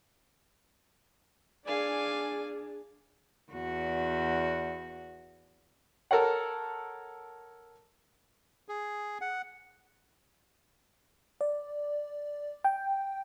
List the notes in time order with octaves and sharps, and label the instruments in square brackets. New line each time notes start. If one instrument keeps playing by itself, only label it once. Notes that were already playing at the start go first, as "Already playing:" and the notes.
[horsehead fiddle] D4 G#4 [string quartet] D5 F5 G#5
[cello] E2 F#4
[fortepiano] A4 A#4 C#5 F#5
[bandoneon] G#4
F#5
[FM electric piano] D5
G5